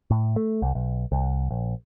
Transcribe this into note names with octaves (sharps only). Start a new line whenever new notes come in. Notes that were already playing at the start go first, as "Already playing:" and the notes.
A2
A3
C2
B1
C2
A#1